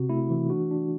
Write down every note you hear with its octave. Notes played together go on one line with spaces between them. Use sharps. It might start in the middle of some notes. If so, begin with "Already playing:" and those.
Already playing: C3 C4 F#4
A3 E4
E3
D4 F#4
D4